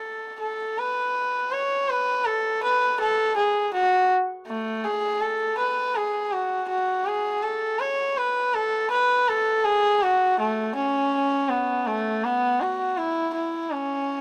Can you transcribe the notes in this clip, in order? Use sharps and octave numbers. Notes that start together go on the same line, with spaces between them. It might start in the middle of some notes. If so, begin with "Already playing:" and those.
Already playing: A4
A4
B4
C#5
B4
A4
B4
A4
G#4
F#4
A3
G#4
A4
B4
G#4
F#4
F#4
G#4
A4
C#5
B4
A4
B4
A4
G#4
F#4
A3
C#4
B3
A3
B3
F#4
E4
E4
C#4